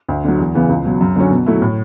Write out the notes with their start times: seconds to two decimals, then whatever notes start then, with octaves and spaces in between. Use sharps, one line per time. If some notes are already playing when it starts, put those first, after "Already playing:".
0.08 D2
0.24 D3 F#3
0.39 E2
0.55 C#3 E3 B3
0.69 C#2
0.85 B2 F#3
1.01 F#2
1.16 D3 F#3 C#4
1.31 B2
1.46 F#3 A3 E4
1.62 A2